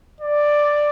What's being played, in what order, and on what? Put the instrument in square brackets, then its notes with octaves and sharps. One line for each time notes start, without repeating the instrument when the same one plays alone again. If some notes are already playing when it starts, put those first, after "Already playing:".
[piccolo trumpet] D5